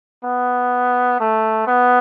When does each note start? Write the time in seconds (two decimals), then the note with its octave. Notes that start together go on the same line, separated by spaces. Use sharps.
0.24 B3
1.20 A3
1.67 B3